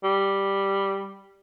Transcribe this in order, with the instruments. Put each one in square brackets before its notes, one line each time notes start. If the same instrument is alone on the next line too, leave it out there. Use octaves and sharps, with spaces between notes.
[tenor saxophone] G3